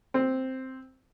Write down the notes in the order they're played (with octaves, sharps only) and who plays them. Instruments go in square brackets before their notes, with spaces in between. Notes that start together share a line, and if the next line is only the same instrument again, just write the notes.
[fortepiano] C4